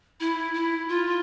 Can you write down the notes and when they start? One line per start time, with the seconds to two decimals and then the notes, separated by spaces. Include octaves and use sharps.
0.20 E4
0.54 E4
0.89 F4